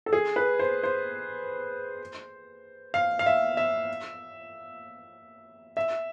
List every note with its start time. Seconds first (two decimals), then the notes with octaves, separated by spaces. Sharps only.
0.06 A4
0.13 G#4
0.36 B4
0.59 C5
0.83 C5
2.94 F5
3.19 F5
3.26 E5
3.57 E5
5.77 E5